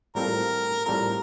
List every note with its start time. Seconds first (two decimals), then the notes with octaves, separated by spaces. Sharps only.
0.15 A2 G3 C4 F4 A4 A#4
0.85 A2 G3 C4 F4 A4 A#4